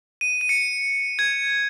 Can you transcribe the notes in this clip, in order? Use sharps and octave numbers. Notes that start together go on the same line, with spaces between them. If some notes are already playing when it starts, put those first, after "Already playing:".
D#7
D#7
C#7
G#6